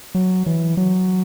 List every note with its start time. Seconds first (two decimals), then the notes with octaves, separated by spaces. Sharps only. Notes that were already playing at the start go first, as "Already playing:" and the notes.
0.15 F#3
0.46 E3
0.77 F#3